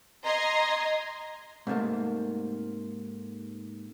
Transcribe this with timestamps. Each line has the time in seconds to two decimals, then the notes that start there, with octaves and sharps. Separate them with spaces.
0.24 D#5 A#5 C6 G#6
1.67 G#2 C3 A3 A#3